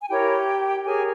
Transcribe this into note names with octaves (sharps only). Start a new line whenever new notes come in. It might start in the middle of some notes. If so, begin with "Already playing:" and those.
G#5
E4 G4 A#4 C#5 G5
G4 G#4 A#4 C#5 G#5